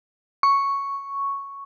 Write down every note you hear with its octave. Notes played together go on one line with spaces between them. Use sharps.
C#6